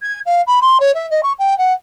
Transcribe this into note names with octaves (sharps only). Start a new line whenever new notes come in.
G#6
F5
B5
C6
C#5
E5
D#5
C#6
G5
F#5